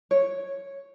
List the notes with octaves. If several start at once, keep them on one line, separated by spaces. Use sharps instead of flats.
C#5